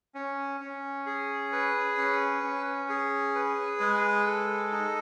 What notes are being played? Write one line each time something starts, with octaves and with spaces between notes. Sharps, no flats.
C#4
C#4
G#4
B4
C#4
C#4
G#4
B4
G#3
A4
D#4